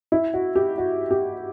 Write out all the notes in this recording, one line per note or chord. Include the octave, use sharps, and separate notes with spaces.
E4
F#4
G4
F#4
G4